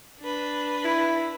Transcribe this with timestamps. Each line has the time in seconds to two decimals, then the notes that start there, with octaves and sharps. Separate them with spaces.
0.19 D4 B4
0.85 E4